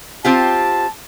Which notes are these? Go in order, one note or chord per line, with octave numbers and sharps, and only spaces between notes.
C4 F4 G4 A5